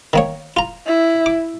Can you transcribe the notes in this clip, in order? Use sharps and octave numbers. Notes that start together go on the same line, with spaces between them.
D#3 A#3 C#5
F4 A#5
E4
D6